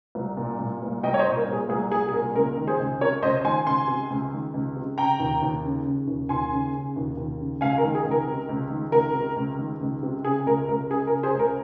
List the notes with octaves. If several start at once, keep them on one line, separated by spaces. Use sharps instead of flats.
C2
A#2
A#2
C2
C2 D#5 G5
C#5
C5 D#5
A#2
A#4
A#2
G#4
C2 G#4
C2 G#4
G#4
A#2 A#4
C#2 A#4
D#3
G#4 C5
C#2
C3 A#4 C#5
C#2 C5 D#5
D#3 G#5 C6
C#2 G#5 C6
C3
C#2
D#3
C#2
C3
C#3 G5 A#5
D#2
D#2
C#3
C#3
D#2
D#2 G#5 C6
C#3
C#3
D#2
D#2
C#3
C#2 F5 G#5
A#4
D#3
G#4
C#2
A#4
C3
C#2
D#3
C#2 A#4
C3
C#2
D#3
C#2
C3
C#3 G#4
C#2 A#4
C#2 A#4
C#3 G#4
A#4
C#3
G#4 C5
C#2 A#4